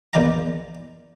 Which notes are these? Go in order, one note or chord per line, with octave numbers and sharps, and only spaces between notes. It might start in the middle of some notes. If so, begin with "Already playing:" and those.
A#1 E2 D#3 D5 F5 A#5